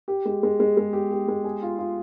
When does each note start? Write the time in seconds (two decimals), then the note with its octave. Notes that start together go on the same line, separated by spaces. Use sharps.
0.08 G4
0.25 G#3
0.43 G#3
0.60 G#3
0.77 G#3
0.93 G4
1.11 G4
1.28 G#3
1.44 G#4
1.63 F4
1.78 F4